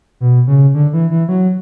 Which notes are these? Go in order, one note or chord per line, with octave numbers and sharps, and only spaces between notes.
B2
C#3
D3
E3
E3
F#3